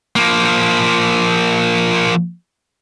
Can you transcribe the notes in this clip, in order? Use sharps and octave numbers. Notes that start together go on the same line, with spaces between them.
F3 A#3